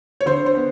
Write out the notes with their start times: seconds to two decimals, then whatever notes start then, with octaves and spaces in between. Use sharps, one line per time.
0.21 C#5
0.26 D3 C5
0.46 C5
0.55 B3